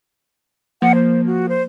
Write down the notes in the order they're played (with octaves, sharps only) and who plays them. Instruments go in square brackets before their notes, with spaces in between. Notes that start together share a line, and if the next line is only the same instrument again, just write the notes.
[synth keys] F3 A#3 [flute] F#5
[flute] C5
F#4
C5